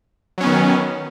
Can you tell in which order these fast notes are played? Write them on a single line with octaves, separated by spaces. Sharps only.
F#3 C#4 B3 D#3